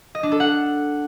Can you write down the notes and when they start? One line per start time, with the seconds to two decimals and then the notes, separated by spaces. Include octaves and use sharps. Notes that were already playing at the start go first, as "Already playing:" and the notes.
0.15 D#5
0.23 D4
0.32 A4
0.40 F#5